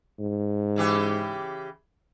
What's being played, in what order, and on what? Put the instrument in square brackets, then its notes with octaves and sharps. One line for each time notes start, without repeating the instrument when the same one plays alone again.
[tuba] G#2
[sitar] C#3 E3 G4